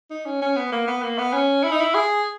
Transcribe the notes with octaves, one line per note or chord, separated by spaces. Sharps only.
D#4
C#4
C#4
B3
A#3
B3
A#3
B3
C#4
E4
D#4
E4
G#4